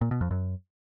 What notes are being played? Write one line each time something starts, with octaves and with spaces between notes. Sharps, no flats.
A#2
B2
F2
F#2